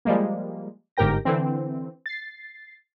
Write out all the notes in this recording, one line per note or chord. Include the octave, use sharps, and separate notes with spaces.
F3 G3 G#3 A#3
G1 G#2 G4 A#4 G5 A#6
D3 E3 C4
A6 C7